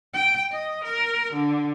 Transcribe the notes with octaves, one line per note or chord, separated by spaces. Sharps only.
G5
D#5
A#4
D3